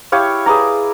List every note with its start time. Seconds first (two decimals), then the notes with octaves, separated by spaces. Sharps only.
0.12 E4 G4 C#5 F5
0.46 G#4 B4 D5 A#5